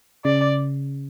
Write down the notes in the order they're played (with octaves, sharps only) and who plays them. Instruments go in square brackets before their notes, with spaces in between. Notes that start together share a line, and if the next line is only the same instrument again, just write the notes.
[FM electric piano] C#3 [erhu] D5